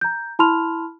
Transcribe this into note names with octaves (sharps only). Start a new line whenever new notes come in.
A#5 G6
E4 A5 B5 C6 F6 F7